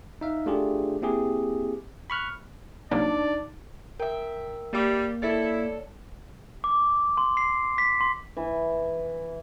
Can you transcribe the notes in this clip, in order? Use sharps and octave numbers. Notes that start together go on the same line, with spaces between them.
D#4 E5 F5
A3 D4 F4 G4 G#4
A#3 C4 E4 G4 G#4
B5 C#6 F6 F#6
C2 F#3 A#3 D4 D#4 D5
A#4 E5 G5
G3 A#3
E4 A4 C#5 D5
D6
C6
C7
B6
C6
E3